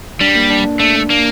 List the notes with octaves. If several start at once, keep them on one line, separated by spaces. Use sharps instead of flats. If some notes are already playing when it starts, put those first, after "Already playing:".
G3 D4
A#3
D4
D4
A3 D4
D4
A#3 D4